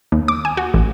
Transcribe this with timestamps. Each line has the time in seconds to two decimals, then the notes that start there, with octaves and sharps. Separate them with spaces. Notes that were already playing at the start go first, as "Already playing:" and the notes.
0.12 D#2
0.28 D6
0.45 G#5
0.57 F#4
0.74 A1